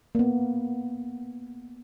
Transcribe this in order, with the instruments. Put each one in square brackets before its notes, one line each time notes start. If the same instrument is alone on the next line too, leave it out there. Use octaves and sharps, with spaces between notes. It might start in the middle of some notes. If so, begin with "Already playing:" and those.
[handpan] A#3 B3